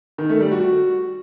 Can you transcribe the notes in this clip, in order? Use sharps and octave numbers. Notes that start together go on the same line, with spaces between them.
D#3
A3
G3
F#4